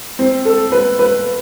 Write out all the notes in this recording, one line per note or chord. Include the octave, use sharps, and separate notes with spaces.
C4
A4
B4
B4